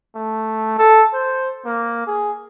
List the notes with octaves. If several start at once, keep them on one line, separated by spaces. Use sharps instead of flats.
A3
A4
C5
A#3
G#4